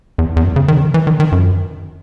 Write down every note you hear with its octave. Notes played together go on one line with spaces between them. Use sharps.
E2
E2
F#2
C#3
D#3
C#3
D#3
E3
D#3
D#3
F#2